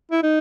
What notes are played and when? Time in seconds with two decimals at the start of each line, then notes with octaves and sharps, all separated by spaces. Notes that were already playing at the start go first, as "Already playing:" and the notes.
0.11 E4
0.23 D#4